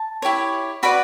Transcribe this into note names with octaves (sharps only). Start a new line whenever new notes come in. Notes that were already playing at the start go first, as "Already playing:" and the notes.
Already playing: A5
E4 G4 C#5
F#4 B4 D5 B5